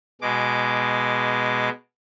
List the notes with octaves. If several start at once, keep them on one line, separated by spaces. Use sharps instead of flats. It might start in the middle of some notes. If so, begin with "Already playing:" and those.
B2 G#3 D6